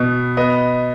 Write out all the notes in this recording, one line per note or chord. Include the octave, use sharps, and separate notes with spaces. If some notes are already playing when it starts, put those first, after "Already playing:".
Already playing: B2 B3
B3 D#5